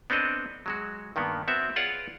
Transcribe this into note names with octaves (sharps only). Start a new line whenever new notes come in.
B3 C4 D4 A4 D#5
F#3 G#3 F#4
G2 D#3 A#3 B3
B3 C4 F#4 E5
F4 G#4 B4 C#5 D5 F#5